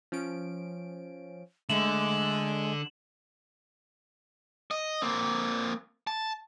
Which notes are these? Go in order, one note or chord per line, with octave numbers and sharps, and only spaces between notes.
F3 C#4 D7
D3 G#3 A3 E7 F#7
D#5
A#3 C4
A5